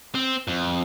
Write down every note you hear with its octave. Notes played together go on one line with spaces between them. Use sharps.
C4
F2